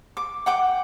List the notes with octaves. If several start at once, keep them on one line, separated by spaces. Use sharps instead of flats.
D6
F#5 G5 D6